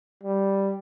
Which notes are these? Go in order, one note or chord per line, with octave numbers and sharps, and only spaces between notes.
G3